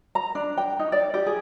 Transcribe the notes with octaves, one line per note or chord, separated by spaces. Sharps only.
A#5
D4
G5
D#4
D5
G4
G#4